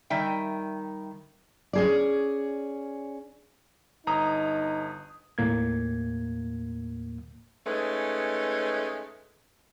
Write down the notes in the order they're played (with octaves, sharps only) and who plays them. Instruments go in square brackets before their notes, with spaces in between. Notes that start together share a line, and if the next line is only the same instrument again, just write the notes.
[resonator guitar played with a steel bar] D#3 G3 E5 G5
[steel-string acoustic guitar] C#4 G#4 D5
[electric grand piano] G1 A#5 D#6 [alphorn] D#4
[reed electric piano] D#2 A2 A#3 G#6
[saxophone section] G#3 A3 C#4 D#4 B4